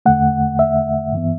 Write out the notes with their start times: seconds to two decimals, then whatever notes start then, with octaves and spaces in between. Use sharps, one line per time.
0.06 E2 D3 A3 F#5
0.59 E5
1.13 G2 E3 B3